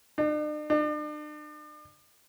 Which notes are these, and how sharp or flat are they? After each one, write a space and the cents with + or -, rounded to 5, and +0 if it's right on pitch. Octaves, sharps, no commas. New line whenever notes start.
D4 +45
D4 +40